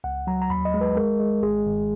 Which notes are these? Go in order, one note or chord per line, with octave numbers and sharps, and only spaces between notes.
C#2 F#5
F#3 A#5
A#5
D#2 B5
D#5
G#3
B4
G#3 A#4
G#3
G#1 G#4
G#1